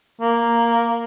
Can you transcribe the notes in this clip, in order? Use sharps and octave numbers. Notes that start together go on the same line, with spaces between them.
A#3